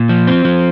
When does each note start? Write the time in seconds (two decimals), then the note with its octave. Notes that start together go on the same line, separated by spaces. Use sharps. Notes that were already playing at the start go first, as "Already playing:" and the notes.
Already playing: A#2
0.09 F3
0.27 C4
0.45 F3